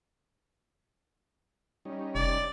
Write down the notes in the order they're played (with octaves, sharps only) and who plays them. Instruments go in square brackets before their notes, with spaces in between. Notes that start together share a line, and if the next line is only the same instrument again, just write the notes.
[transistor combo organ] G3 C#4 D#4
[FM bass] F1 [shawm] D5